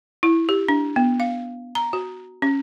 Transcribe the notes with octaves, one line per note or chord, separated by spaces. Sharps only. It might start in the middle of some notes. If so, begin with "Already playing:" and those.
E4
G4
D4
B3
F5
A#5
F#4
C#4